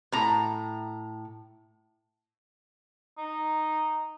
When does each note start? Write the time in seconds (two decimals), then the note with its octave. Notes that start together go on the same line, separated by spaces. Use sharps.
0.12 A2 A#5
3.18 D#4